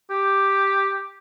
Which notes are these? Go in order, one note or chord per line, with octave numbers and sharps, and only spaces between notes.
G4